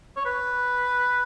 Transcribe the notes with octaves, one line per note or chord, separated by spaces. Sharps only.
C#5
B4